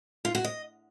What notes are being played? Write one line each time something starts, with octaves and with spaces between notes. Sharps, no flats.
F4
F#4
D#5